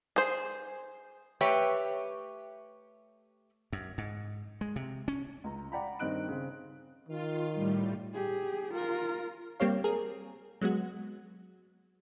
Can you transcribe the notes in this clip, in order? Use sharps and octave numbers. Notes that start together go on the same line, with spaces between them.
G#4 C5
A3 G4 B4 C#5 E5 G5
F#2
G#2
G#3
C3
C#4
C#2 A#5
D5 F#5 G5 A#5 B5
G2 D#3 C4 D#5 F#6 D7
C#3 C4
D#3 F4
A2 G3
G4 G#4
F4 A#4
G3 A#3 C4 G4 C#5 F5
G#4 A#4
F#3 G#3 B3 F#4